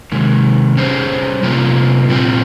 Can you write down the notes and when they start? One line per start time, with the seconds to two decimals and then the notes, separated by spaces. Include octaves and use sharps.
0.12 C3 D#3 G#3
0.77 G3 C#4 G#4 C5
1.43 C3 F3 A#3 F4
2.09 A#2 G3 C4 F4